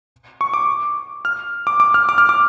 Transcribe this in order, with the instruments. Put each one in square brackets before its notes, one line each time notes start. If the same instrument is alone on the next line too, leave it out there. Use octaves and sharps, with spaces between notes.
[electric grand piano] C#6
D6
F6
D6
D6
F6
D6
F6
D6